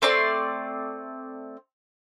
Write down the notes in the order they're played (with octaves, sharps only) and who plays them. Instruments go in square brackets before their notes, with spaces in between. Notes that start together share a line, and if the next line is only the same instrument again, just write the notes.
[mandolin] A3 C4 D5 C6